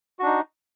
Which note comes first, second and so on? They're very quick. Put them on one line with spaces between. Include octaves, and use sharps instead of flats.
F#4 D4 D#4